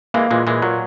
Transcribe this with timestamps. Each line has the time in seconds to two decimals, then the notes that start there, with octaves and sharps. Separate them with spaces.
0.14 E3 G#3 A#3
0.31 A#2 E3 G#3
0.47 A#2 E3 G#3
0.62 A#2 F#3